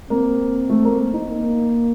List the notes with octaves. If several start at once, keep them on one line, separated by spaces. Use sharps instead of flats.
A#3 C4
A3
A#3
D#4
A#3